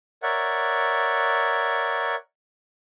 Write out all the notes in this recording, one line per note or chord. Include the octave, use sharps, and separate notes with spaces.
A#4 C#5 D5 E5 F#5